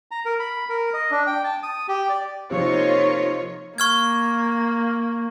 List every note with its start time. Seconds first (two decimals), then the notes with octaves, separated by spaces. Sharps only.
0.11 A#5
0.25 A#4
0.39 B5
0.69 A#4
0.93 D#5
1.11 D4
1.27 G5
1.44 A5
1.63 D#6
1.88 G4
2.09 D5
2.51 C3 F3 A#3 D#4 F4 C#5
3.78 A#3 C#6 F6 G#6